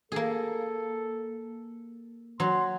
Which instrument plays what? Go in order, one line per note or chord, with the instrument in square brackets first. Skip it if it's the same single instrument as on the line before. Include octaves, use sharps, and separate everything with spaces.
[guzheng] A#3 G#4 [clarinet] A4
[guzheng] F#3 [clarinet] C6